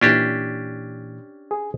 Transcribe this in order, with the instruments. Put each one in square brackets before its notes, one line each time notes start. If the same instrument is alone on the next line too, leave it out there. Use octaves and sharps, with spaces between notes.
[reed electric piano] A#2 E3 [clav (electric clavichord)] C#4 D4 G4
[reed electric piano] G#4